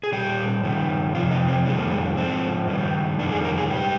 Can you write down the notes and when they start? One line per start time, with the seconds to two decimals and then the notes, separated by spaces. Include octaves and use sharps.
0.03 G#4
0.12 A#2 G3 G4
0.63 G2 D#3 G3
1.15 F2 C3 F3 F4
1.31 D#4
1.48 C4
1.66 F2 D#3 G3 G#3
1.78 A#3
1.92 G#3
2.17 G#2 F3 C4
2.68 G2 D#3 G3
3.19 F2 D#3 G3 D4
3.32 G#4
3.45 A#4
3.58 G#4
3.70 G#2 G3 G4